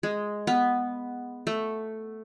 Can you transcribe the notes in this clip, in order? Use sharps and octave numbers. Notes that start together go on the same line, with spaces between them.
G#3
B3
A3